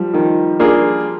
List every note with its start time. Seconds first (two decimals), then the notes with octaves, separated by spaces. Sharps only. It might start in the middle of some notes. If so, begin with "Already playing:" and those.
Already playing: F3 G3
0.13 D#3 F3
0.60 A#3 D4 F4 G#4